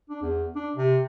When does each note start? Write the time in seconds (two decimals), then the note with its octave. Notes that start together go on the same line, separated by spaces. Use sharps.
0.10 D4
0.22 E2
0.56 D4
0.76 C3